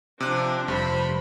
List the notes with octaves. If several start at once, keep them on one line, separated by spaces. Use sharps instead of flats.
C3 F3 D4 F#6
F1 G2 C5 B5